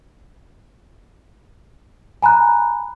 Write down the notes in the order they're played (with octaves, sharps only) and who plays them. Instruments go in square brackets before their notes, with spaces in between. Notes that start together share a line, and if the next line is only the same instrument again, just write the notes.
[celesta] G#5 A#5 B5 F#6